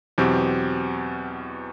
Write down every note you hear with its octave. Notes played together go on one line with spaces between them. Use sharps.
E2 B2 F#3 C4 G4